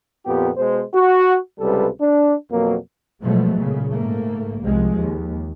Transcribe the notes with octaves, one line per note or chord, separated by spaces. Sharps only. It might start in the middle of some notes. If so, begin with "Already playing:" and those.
F2 A#2 B3 G4
B2 G#3 C5
F#4
C#2 C3 G3 A4 B4
D4
F2 B2 F#3 A#3
B2 F3 F#3 G#3 A3 B3
A#2 C#3
G#2 A3 A#3
C2 F3 G#3
D#2